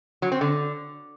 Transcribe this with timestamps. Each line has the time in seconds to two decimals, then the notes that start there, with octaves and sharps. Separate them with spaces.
0.22 F#3
0.32 C4
0.41 D3